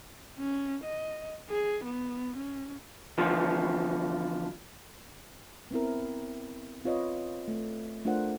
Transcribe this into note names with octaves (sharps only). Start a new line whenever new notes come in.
C#4
D#5
G#4
B3
C#4
D3 E3 F3 B3 F4
B3 C4 E4 A#4
C4 F4 B4 C#5 D#5
A3
A3 D4 F4 A#4 C5 F#5